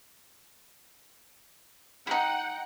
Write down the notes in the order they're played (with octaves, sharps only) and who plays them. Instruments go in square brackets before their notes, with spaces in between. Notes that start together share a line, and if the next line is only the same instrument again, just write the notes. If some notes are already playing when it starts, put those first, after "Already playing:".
[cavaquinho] D#4 E4 [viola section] F#5 G5